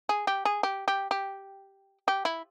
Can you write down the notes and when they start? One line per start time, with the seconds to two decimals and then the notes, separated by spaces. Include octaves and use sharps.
0.09 G#4
0.27 G4
0.45 G#4
0.63 G4
0.88 G4
1.11 G4
2.08 G4
2.25 E4